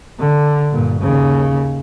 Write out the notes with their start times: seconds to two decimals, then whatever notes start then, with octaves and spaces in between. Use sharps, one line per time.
0.19 D3
0.72 G2 A#2
1.01 D#2 C#3